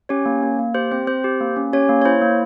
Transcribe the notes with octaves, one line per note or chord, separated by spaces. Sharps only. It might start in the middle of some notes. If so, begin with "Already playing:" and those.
C#4 G4 C#5
A#3
A#3
A#3
G4 C5
C4 C5
C4 C5
G4
A#3
C#4
C#4 G4 C#5
A#3
C#5
E4 C5
A#3